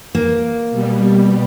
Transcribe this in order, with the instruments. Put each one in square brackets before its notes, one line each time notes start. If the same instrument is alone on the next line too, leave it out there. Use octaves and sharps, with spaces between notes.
[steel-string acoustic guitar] A#3
[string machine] B2 G3